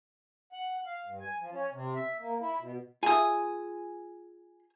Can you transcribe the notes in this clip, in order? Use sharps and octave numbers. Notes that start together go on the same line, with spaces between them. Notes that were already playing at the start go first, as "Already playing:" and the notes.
F#5
F5
G2
G#5
F3
C#4
C3
E5
A#3
E4
B2
F4 G#4 E5 G#5 D#6